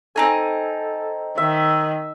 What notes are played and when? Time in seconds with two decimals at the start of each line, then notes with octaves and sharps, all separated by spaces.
0.16 C4 D#4 A4 G#5
1.38 D#3 E5